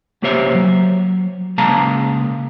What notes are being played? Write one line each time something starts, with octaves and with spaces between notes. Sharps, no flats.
C#2 A#3 G4 C5 C#5 E5
F#3
C#3 G#3 A#3 F5 A5 A#5